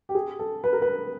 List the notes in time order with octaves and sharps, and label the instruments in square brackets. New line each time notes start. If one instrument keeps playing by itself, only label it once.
[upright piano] G4
G#4
A4
B4
A#4
B4